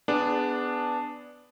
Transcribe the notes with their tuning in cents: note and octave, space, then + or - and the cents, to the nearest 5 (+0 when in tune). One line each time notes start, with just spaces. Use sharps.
B3 +10 D4 +0 G#4 -15